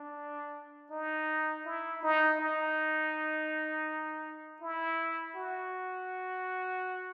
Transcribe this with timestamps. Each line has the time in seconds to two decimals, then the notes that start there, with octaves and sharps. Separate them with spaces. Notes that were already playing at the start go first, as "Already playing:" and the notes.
Already playing: D4
0.91 D#4
1.66 E4
2.03 D#4
2.40 D#4
4.62 E4
5.36 F#4